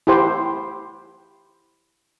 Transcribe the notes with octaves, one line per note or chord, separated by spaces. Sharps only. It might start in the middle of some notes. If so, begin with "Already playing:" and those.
E4 G4 C5